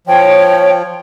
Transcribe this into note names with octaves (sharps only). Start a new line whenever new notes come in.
F3 C#5 G5